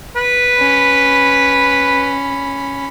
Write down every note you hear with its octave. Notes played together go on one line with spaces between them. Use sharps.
B4
C#4 B5